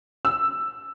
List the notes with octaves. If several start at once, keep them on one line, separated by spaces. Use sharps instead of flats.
E6